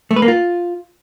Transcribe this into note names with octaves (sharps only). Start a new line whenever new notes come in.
A3
B4
A#3
F4